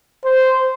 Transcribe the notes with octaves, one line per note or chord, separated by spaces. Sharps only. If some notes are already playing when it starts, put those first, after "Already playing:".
C5